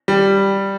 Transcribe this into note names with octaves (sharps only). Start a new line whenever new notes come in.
G3